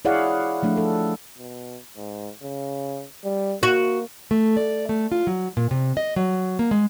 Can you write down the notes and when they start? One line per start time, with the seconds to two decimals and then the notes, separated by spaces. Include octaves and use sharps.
0.05 E4 G#4 C#5 D5 F5 F#5
0.63 F3 A3 D4
0.77 A4
1.38 B2
1.97 G#2
2.43 C#3
3.24 G3
3.63 A#3 F#4
4.31 A3
4.57 D5
4.89 A3
5.12 F4
5.27 F#3
5.57 A#2
5.71 C3
5.97 D#5
6.16 F#3
6.59 A#3
6.71 G#3